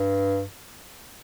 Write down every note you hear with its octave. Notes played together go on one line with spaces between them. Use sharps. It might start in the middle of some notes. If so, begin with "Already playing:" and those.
Already playing: G2